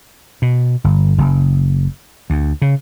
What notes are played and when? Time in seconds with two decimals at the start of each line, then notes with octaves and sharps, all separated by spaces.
0.42 B2
0.84 G1
1.18 F#1
2.30 D2
2.62 C#3